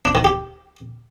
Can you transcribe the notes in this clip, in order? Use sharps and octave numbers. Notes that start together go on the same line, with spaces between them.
D4
D#3
G4